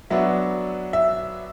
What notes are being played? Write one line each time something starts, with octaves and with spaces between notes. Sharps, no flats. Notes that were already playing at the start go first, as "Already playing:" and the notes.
F#3 B3 D4 E5
E5